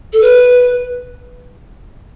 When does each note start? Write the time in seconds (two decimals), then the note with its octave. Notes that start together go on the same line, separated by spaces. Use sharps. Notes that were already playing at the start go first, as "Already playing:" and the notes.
0.13 A4
0.21 B4